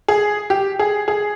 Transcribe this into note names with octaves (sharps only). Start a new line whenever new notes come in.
G#4
G4
G#4
G#4